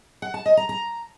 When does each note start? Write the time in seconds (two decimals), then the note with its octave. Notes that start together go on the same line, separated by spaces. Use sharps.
0.22 F#5
0.34 A5
0.46 D#5
0.57 A#5
0.69 A#5